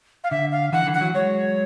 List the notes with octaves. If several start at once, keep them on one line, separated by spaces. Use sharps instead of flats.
F5
D3 E5
F5
D3 E3 F#5
D3 E3
F#5
E3 F#3
F#3 G#3 C#5